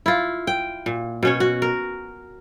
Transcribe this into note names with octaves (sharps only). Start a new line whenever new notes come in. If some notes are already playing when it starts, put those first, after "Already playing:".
E4 F4
G5
A#2
B2 C#4 C#5
F#4
A#4